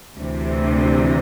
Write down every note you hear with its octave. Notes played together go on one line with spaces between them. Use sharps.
D2 C3 E3